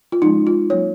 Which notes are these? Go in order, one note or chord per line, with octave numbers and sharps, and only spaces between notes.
F4
F3 G#3 C#4 D#4
F4
F#3 A#3 C#4 C#5